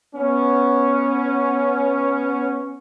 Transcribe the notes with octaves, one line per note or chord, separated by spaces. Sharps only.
B3 C#4